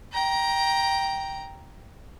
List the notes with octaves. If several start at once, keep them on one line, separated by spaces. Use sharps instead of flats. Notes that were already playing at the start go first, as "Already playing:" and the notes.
G5 A#5